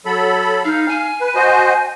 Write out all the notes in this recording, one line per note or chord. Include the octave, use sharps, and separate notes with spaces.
F#3 A4 B5
D#4 F5
G#5
B4
F#4 C5 D#5